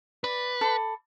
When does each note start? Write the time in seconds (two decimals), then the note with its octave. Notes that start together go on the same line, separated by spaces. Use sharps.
0.24 B4 D5
0.61 A4 B5 D6